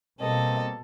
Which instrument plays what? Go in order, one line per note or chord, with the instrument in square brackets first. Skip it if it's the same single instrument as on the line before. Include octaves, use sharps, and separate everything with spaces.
[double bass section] B2 [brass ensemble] G3 A#3 C4 [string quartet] A4 [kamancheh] D#5